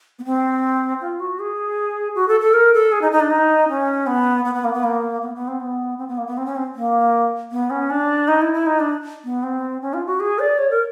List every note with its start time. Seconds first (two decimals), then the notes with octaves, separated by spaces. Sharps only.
0.19 B3
0.25 C4
1.01 F4
1.20 F#4
1.39 G#4
2.15 F#4
2.28 A4
2.40 A4
2.53 A#4
2.74 A4
2.92 G#4
3.02 D#4
3.12 D#4
3.20 D4
3.30 D#4
3.69 C#4
4.07 B3
4.45 B3
4.55 B3
4.64 A#3
4.73 B3
4.84 A#3
5.22 B3
5.35 B3
5.48 C4
5.60 B3
5.98 C4
6.08 B3
6.18 A#3
6.27 B3
6.37 C4
6.46 C#4
6.56 C4
6.75 A#3
7.52 B3
7.70 C#4
7.90 D4
8.28 D#4
8.42 E4
8.53 E4
8.66 D#4
8.79 D4
9.25 B3
9.43 C4
9.82 C#4
9.94 F4
10.06 F#4
10.20 G#4
10.39 D5
10.58 C#5
10.71 A#4